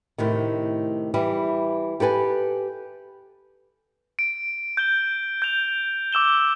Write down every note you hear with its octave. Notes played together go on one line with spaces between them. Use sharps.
A2 C3 D#3
E3 G3
G4 A4 B4 G#5
D7
G6 G7
G6 F7
D6 E6 E7 G7